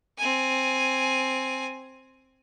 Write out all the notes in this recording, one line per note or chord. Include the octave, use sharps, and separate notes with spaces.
C4 G#5